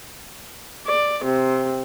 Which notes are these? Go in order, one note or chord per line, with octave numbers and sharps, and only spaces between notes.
D5
C3